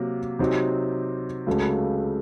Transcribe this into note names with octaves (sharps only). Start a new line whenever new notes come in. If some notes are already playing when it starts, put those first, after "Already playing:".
Already playing: C3 F#3 A#3
C3 F#3 C4 D#4
C#2 C#3 F#3 A3